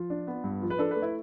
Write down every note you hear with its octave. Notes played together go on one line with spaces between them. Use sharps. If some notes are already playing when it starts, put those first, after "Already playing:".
Already playing: F3 F4
D4
B3
G2
F3
B4
D4 A4
B4
A3
E4